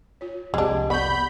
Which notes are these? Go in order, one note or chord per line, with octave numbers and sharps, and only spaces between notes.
F4 C#5
F1 C2 F2 G#3 D4 G4 G#4
B3 D5 B5 C#6 G6